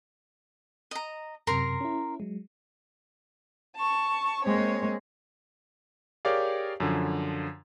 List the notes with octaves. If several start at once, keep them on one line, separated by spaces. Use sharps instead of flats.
D#5 A#5
F#2 C3 A#4 A#5 C6
C#4 E4
F#3 G#3
A5 C#6
G#3 A#3 C4 C#5
G4 G#4 A#4 C#5 D5 F5
F#2 D3 F3